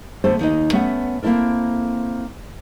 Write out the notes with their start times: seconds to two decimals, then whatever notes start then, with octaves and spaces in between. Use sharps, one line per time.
0.24 D3 A3 B3 A4 C5
0.39 D#2 D#4 D#5
0.73 A3 B3 C#4 E5 F#5
1.23 A#3 C4 E4 A4 A#4